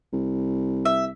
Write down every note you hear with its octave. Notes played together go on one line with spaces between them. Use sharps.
C2
E5